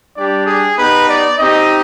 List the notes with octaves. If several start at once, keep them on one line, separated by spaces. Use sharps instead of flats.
G3 D4 G4 D5
G#4
B3 D#4 G4 B4
D5
C4 D#4 G4 D#5